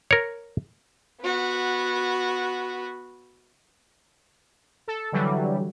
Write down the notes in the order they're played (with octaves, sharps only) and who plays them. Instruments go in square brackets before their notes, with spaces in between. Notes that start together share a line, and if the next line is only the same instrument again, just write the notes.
[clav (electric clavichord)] A#4 C#5
[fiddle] B3 F#4
[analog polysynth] A4
D3 E3 F#3 G3